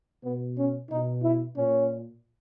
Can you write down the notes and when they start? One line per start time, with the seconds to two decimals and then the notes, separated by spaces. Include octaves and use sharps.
0.24 B2 B3
0.57 C#4
0.90 B2 D#4
1.23 E4
1.56 A#2 C#4